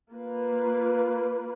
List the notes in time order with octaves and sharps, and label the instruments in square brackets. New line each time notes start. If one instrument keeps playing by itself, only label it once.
[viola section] A#3 F4 B4